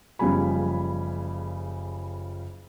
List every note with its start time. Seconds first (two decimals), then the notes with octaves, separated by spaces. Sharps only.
0.19 F#1 C#3 F3 G3 G#5 B5